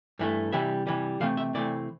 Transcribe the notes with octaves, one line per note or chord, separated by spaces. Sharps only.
G2 E3 A3
C3 E3 G3 E5
C3 E3 G3
C3 E3 A3 C4 F5
E5
C3 E3 A3 C4 D5